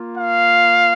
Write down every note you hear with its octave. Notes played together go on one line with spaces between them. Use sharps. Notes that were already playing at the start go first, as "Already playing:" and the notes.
Already playing: A#3 F4
F5